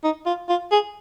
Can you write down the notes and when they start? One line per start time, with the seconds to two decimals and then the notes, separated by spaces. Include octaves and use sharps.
0.04 D#4
0.26 F4
0.48 F4
0.71 G#4